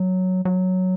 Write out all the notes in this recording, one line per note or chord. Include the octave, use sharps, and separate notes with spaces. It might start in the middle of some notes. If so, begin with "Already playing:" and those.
Already playing: F#3
F#3